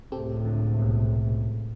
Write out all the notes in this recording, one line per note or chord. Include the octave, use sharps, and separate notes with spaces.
C#2 A2 C3 C4 G4 A4
D3
C2 B2